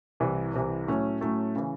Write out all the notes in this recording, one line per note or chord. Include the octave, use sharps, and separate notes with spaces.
C2 C3 E3
C2 C3 E3
A2 F#3 A3 C#4
A2 F#3 A3 C#4
C#3 E3